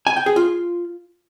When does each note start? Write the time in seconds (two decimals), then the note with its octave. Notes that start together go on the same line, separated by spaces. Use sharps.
0.07 G#5
0.16 G5
0.26 G#4
0.36 F4